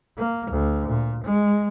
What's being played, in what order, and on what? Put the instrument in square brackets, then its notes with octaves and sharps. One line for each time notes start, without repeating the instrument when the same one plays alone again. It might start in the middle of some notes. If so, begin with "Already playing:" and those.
[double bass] A#3
D2
A#2
G#3